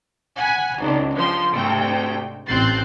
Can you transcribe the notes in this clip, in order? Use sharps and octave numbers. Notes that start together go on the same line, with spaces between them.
F#5 G#5 B5
G#1 C#2 D4
G1 F3 C6
D2 G#2 C3 A3 G5
A1 C4 F#6 G6 A6 C7